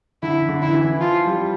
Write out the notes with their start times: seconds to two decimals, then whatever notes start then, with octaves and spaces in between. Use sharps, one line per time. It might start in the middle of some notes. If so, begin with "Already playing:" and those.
0.23 D3 E4
0.49 D3
0.62 E4
0.74 E3
1.00 F3 F4
1.26 G3